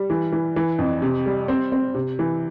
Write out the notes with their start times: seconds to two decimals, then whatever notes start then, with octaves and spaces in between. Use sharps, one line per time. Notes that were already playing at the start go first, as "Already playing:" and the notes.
Already playing: G3
0.10 E3
0.32 E3
0.56 E3
0.79 F2
1.02 C3
1.26 G3
1.48 C4
1.72 C4
1.95 C3
2.19 E3